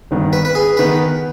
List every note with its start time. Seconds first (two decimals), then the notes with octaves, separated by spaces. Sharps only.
0.11 G#1 G2 D#3 B3
0.33 B4
0.45 B4
0.55 G#4
0.77 D#3 B3 B4